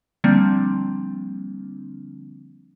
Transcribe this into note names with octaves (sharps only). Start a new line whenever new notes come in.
D3 F3 G3 A#3 C4 D4